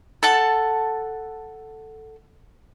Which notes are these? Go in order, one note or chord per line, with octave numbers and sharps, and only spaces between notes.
A4 F#5 A5